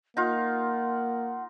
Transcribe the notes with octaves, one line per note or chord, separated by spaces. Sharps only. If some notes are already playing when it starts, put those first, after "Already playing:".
A#3 D#4 F4 F#5